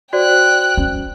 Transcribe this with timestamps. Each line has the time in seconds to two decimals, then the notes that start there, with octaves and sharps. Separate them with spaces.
0.13 F#4 C5 D5 G5 F#6
0.77 C#4